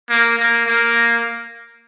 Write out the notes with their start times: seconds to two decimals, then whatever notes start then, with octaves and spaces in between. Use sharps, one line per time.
0.09 A#3
0.38 A#3
0.66 A#3